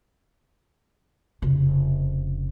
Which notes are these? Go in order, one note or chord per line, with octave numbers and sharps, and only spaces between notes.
F1 C#3